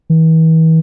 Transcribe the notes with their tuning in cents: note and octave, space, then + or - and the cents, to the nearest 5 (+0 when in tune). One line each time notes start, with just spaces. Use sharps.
E3 -40